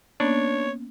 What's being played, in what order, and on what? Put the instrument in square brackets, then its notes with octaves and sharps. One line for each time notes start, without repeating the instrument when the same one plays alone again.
[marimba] A#3 B3 C#4 [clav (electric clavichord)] D4 [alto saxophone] C#5